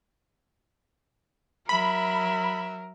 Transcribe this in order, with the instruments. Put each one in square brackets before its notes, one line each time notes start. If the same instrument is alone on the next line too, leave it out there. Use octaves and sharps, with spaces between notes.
[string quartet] F#3 E5 [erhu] A#4 [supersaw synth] B5